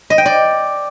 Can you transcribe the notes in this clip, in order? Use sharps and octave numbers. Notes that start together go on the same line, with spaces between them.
D#5
G5
D5